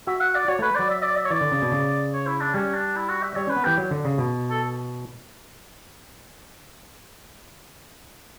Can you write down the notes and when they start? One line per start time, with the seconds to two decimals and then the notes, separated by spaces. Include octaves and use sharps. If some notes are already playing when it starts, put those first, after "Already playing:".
0.07 F#4 E5
0.21 F#5
0.35 D5
0.48 F#4 C#5
0.59 A3 B4
0.75 F#3 D5
0.90 E5
1.03 D5
1.16 E5
1.25 C#5
1.30 E3 D5
1.41 D3
1.52 C#3
1.62 B2
1.72 C#3
2.13 C#5
2.27 E4
2.40 D4
2.54 G3 C#4
2.74 D4
2.96 E4
3.09 F#4
3.23 E5
3.36 G3 C#5
3.47 C#4 B4
3.56 B3
3.64 E3 G4
3.77 F#3
3.91 D3
4.05 C#3
4.18 B2
4.51 A4